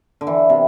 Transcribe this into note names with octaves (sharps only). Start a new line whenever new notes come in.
D3
E3
C3